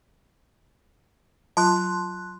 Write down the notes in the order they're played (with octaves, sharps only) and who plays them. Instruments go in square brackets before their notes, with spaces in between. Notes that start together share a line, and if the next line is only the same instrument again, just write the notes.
[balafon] F#3 F4 [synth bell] A5 C6 F#6